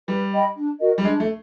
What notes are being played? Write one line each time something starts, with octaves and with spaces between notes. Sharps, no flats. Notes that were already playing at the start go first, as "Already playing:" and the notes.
G3 B4
D#5 G5 B5
D4
F#4 A#4 D#5
G3
G#3 D4
A3